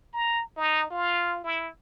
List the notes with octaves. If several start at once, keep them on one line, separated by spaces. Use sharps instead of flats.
A#5
D#4
F4
E4